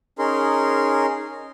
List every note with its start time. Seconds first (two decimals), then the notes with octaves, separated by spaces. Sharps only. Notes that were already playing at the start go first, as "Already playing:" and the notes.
0.19 C#4 D#4 G#4 A#4 C6